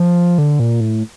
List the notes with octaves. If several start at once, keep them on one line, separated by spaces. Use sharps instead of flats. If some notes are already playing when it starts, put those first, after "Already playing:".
Already playing: F3
D3
A#2
A2